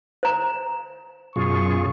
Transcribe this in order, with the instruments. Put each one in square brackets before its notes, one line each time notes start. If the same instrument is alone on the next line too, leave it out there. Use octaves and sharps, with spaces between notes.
[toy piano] C5 A#5
[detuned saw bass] F#2 [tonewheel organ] B2 F4 G#4 [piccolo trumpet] C#6